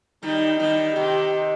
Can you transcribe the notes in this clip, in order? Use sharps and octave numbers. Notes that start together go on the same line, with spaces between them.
D#3 G3 D#4
D#3 G3 D#4
C3 D#3 G4